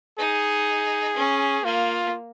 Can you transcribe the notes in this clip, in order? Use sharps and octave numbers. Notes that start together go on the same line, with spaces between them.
D#4 G#4
C#4
A#3 F4